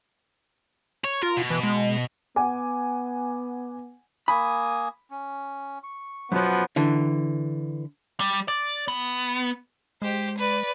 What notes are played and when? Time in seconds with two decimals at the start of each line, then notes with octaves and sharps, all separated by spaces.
1.04 C#5
1.23 F4 A#4
1.37 B2
1.50 E3
1.63 G#3
2.36 B3 F#5 G#5 D6
4.28 A#3 G#5 B5 D#6
5.11 C#4
5.83 C#6
6.32 F#2 B2 F3 F#3 B3
6.76 D3 E3
8.20 G3
8.48 D5
8.88 B3
10.02 G#3 G4 C5
10.38 B4 D5